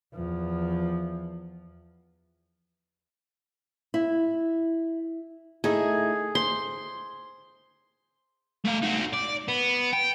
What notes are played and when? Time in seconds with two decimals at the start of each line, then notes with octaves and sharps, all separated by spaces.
0.14 E2 F3
3.94 E4
5.64 A3 D#4 E4 G#4
6.35 C5 C6
8.65 A3 F5
8.83 D#4 F#4
9.14 D5
9.48 B3
9.93 G5